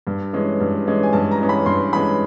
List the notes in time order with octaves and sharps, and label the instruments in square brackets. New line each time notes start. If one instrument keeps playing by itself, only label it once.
[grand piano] G2
E3 G#3 C#4
G2
E3 G#3 C#4
G#5
G2 A5
A#5
E3 G#3 C#4
B5
G2 C6
E3 G#3 C#4 B5